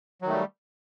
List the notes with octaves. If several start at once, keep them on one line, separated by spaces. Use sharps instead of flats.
D#3 F#3 G3 A3